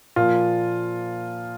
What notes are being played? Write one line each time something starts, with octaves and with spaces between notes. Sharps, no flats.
A#2 F3 A#3 F4